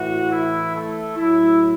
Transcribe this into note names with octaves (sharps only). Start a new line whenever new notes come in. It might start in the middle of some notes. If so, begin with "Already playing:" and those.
Already playing: A2 E3 F#4
E4
A3
A2 F#3 E4